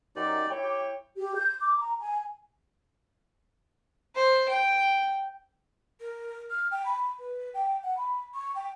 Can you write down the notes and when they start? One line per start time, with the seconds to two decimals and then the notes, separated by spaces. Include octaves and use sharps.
0.16 F#2 D#4 G4 D5
0.50 E4 C#5 G5
0.63 G4
1.17 G4
1.36 G6
1.60 D6
1.78 A#5
2.00 G#5
4.15 C5
4.48 G5
6.00 A#4
6.50 F6
6.71 G5
6.85 B5
7.19 B4
7.54 G5
7.83 F#5
7.97 B5
8.34 C#6
8.55 G5